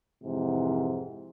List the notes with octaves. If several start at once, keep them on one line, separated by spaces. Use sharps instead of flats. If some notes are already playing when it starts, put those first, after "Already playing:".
F2 G#2 C3 E3